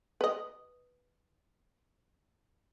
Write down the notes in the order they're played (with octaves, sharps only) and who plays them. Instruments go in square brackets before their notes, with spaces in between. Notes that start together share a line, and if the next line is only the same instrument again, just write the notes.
[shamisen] B4 D#5